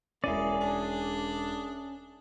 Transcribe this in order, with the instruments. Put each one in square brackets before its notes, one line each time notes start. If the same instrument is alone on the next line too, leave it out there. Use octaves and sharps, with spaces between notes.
[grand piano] E1 E4 D#7 [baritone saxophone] A#3 [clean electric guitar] C#4 [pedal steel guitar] G#4 D5
[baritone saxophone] D4